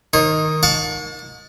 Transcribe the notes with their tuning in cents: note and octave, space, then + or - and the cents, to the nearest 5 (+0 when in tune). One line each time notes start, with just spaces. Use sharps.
D#3 +0 C#5 -40
F#5 -45 A5 +0 C#6 +30